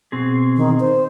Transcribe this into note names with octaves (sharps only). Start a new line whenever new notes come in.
B2 C4 G#4
D#3
C5